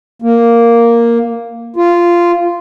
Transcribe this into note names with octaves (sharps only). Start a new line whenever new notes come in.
A#3
F4